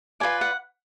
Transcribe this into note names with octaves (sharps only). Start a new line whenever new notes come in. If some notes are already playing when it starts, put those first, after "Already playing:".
F4 B4 D5 G#5
F#5